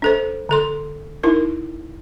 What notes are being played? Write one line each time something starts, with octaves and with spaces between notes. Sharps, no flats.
D4 A4 C5
D3 A4 C6
D#4 E4 A#4